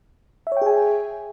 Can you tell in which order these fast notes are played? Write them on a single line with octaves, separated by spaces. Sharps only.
E5 C#5 G5 G#4 G#5